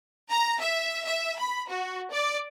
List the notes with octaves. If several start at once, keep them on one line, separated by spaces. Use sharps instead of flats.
A#5
E5
E5
B5
F#4
D5